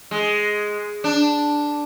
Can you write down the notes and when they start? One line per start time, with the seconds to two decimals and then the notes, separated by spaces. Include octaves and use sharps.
0.11 G#3
1.04 D4